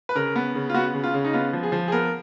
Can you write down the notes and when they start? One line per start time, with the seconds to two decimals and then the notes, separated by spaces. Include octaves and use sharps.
0.09 B4
0.15 C#3 A#4
0.36 B3
0.55 C#3
0.70 F4
0.74 B3 F#4
0.94 C#3
1.04 F4
1.14 C#3
1.25 D#4
1.33 B3 F4
1.53 F3
1.63 G#4
1.72 F3
1.88 G#4
1.92 B3 A#4